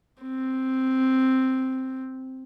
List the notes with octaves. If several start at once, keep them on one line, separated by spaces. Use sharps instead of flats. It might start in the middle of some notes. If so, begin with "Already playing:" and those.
C4